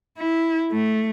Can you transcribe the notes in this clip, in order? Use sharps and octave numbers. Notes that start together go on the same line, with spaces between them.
E4
A3